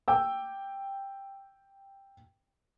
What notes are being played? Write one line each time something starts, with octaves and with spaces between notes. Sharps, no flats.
G5 D6 E6